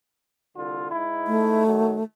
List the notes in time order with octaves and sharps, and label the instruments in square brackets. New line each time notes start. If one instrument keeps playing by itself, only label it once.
[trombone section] C2 D3 F4
G#2 D#4 E4
[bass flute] A3
[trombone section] D#3 F#3